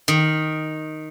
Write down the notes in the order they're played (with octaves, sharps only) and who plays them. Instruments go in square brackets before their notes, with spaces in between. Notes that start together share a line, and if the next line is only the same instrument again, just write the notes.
[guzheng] D#3